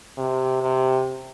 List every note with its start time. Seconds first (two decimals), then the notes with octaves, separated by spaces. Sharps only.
0.18 C3
0.62 C3